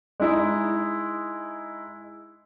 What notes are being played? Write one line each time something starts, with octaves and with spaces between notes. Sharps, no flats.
G#3 D#4 E4